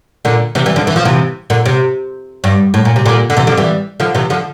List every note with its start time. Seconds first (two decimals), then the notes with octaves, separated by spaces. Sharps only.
0.25 A#2 D3
0.55 C3 E3
0.66 E3 G3
0.76 D3 F3
0.87 E3
0.96 F3
1.05 C3 E3
1.50 A#2 D3
1.66 C3
2.44 G2
2.74 A2
2.85 A#2
2.96 C3
3.06 A#2 D3
3.30 D3
3.37 C3 E3
3.47 D3 F3
3.57 E3 G3
4.00 D3 F3
4.15 C3 E3
4.30 D3 F3